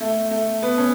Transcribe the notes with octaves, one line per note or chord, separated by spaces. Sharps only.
A3
A3
B3
C#4